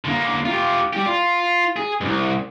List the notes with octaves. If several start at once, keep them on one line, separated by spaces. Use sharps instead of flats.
D3 A#3
F4 G4
G3 G4
F4
G#4
C2 G2